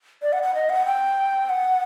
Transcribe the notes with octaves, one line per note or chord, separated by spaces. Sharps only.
D5
F#5
F#5
D#5
F#5
G5
F#5